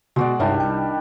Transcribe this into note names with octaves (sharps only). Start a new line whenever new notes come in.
B2 G#3 F#4 D5
C2 G2 D#3 G3 D4 C#5 E5
G5